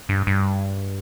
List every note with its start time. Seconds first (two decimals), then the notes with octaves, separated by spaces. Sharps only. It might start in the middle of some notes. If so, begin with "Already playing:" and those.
0.09 G2
0.27 G2